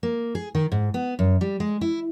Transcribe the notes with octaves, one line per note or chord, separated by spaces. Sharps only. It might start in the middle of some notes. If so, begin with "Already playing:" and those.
A#3
G#4
D#3
G#2
B3
F#2
G3
G#3
E4